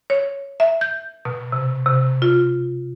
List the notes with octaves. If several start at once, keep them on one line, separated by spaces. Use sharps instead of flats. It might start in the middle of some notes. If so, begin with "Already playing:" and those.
C#5
E5
G6
B2
C3
C3
F4